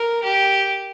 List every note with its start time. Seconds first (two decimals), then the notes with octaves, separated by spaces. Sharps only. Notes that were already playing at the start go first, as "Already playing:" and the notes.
Already playing: A#4
0.23 G4